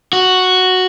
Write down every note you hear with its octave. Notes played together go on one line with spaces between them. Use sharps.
F#4